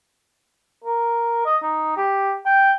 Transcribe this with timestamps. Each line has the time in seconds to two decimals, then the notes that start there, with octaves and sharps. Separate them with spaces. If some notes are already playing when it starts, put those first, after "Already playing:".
0.84 A#4
1.46 D#5
1.62 D#4
1.97 G4
2.46 G5